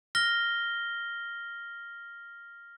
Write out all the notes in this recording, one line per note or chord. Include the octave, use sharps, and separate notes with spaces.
F6 A#6 G7